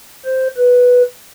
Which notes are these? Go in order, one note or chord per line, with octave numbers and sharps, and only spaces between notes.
C5
B4